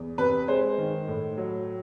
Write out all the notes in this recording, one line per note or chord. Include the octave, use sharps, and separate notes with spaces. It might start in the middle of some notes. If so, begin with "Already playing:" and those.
Already playing: E2
C3 B4
G#3 C5
D#3
A2
F#3